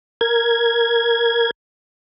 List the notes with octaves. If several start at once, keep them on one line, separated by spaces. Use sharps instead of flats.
A#4 G#6